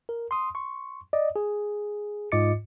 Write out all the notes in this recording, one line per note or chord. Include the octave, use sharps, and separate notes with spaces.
A#4
C6 D#6
C6 C#6
D5 D#5
G#4
G#2 F4 D#5 D6 A6 C#7